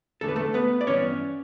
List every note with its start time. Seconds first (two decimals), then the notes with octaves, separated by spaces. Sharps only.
0.21 E2 D3 A3 A4
0.28 B4
0.36 A3 A4
0.54 B3 B4
0.81 D5
0.87 G2 E3 B3 C#4 C#5